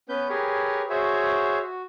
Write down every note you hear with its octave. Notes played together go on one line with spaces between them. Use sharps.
B3 C#4 B4 G6
G4 G#4 A#4 B4 C#5
F#4 G#4 C5 C#5 E5
F#4